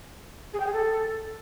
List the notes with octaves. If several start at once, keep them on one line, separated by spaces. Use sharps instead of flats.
G#4
G5
G#4
A4